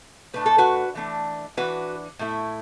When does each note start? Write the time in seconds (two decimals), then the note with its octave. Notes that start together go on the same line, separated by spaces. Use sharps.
0.34 A2 A3 D4 B4
0.46 A4
0.58 F#4 B4
0.95 E3 A3 D4
1.57 E3 D4 F#4 B4
2.19 A2 A3 E4